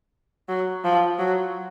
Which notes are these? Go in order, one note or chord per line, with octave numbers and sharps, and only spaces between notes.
F#3
F3
F#3